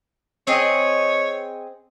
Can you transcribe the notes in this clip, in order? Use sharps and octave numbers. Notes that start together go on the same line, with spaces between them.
C4 G#4 C#5 D#5